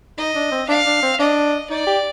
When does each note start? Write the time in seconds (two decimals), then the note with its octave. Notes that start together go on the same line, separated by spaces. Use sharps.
0.18 D#4 D#5
0.35 D4
0.52 C4
0.69 D4 F5
0.86 D4
1.03 C4
1.20 D4 D#5
1.70 D#4 D5
1.87 G4